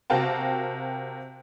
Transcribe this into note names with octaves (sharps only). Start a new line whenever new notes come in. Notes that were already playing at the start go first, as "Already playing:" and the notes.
C3 F#4 A#4 F5 G5 A5